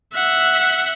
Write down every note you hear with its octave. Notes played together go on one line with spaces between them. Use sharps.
E5 F#5